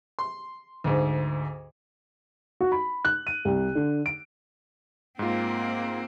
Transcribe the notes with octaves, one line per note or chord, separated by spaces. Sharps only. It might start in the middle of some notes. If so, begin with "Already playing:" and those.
C6
D2 G#2
F#4
B5
F#6
D#7
C2
D3
D7
G#2 A#3 C4 F4